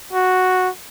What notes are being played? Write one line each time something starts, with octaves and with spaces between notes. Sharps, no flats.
F#4